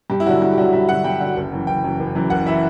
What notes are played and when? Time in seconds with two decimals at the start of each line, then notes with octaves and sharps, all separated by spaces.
0.10 G2 G4
0.20 E4
0.26 D3 F#3 F#4
0.42 G2 E4
0.51 G4
0.57 D3 F#3 F#4
0.73 G2 E5
0.89 D3 F#3 F#5
1.04 G2 G5
1.20 D3 F#3
1.37 F#1
1.52 F#2 E3
1.67 F#1 G5
1.84 F#2 E3
2.00 F#1
2.15 F#2 E3
2.30 F#1 F#5
2.46 E3 E5